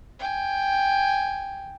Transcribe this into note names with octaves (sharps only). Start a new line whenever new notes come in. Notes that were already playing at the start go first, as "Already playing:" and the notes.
G5 G#5